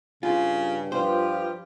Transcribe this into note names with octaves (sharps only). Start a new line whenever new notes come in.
G2 C#3 F4
F3 F4 G4 B4 C5